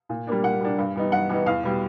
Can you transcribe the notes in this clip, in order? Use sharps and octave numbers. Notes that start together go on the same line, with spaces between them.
A#2
G3 A#3 D4
A#2 F#5
G3 A#3 D4
G2
E3 G3 B3 D#4
G2 F#5
E3 G3 B3 D#4
E2 F5
B2 G3